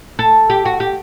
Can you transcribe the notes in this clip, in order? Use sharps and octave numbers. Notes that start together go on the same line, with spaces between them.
A4
G4
F#4
G4